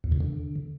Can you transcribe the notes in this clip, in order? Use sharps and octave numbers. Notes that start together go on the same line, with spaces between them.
E2
C3
D3